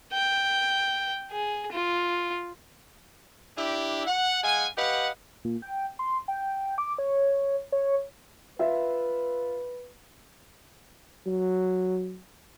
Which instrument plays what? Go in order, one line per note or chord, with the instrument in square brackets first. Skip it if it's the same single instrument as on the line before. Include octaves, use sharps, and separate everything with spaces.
[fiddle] G5
G#4
F4
[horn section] D4 E4 G4
F#5
G#3 F5 F#5 G#5
G4 B4 D#5 F5 F#5
[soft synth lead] A#2
G5
C6
G5
D6
C#5
C#5
[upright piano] F4 E5 [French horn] B4
[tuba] F#3